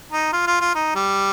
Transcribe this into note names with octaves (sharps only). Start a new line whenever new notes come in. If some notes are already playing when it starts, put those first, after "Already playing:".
D#4
F4
F4
F4
D#4
G3